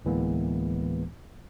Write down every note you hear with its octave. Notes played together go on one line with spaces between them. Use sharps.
D2 A2 E3 G#3 A#3 B3